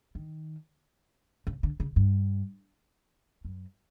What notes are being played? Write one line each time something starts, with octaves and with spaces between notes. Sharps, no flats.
D#3
C#3
D3
C#3
G2
F#2